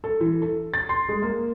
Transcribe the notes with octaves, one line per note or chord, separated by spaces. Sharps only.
A4
E3
A4
A6
C6
G#3
A#3